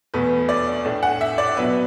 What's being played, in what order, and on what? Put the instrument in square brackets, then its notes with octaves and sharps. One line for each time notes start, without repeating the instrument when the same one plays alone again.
[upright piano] E2 B2 A3 B4
D5
A2 A3 D4
F#5
E5
D5
B2 F#3 B3 D4 B4